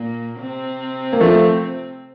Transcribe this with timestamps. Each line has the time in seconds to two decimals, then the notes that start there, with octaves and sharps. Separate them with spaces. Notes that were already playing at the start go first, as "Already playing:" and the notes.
Already playing: A#2 A#3
0.40 C3 C4
1.13 A#3
1.21 F3 A3